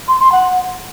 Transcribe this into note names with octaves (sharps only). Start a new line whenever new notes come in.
C6
C6
F#5